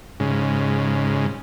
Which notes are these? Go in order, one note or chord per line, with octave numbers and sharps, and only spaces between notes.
G#2 C#3